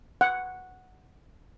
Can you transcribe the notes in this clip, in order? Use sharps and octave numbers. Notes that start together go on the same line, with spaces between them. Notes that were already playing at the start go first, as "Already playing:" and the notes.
F#5